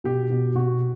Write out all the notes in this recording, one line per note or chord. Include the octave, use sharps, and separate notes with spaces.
B2 G4
B2
B2 F#4